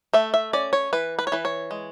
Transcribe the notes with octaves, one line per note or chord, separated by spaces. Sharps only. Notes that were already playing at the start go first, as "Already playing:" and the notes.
A3 E5
E5
C#4 D5
C#5
E3 B4
B4
C#5
E3 B4
C#5
G#3